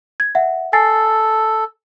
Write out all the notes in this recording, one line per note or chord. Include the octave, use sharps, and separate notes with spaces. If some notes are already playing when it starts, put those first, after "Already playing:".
G#6
E5 F#5
A4 G#5 A6 C7